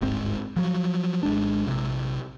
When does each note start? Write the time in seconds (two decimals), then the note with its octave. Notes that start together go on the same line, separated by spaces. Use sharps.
0.01 D1 G1 G#2 C4
0.57 F3 F#3
1.23 G#1 G#3 D4
1.67 A#1 C3